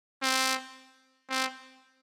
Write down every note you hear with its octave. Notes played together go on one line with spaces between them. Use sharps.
C4
C4